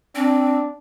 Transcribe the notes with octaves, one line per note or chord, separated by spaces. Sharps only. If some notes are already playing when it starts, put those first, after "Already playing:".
C4 D4